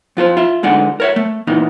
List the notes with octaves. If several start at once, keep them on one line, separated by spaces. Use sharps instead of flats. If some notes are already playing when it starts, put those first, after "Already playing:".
F2 F4 A4 C5
F4 E5
D2 D3 G#3 D#4 D5 F#5
A#4 C#5 E5
A3
A#2 E3 D#4